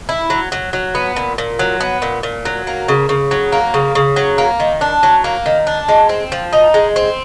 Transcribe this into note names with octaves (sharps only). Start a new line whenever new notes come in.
E4
F#3
F#3
F#3
B3
A#2
A#2
F#3
B3
A#2
A#2
F#3
A#3
C#3
C#3
F#3
A#3
C#3
C#3
F#3
A#3
D#3
D4
F#3
A#3
D#3
D4
G#3
C4
F3
D#4
G#3
C4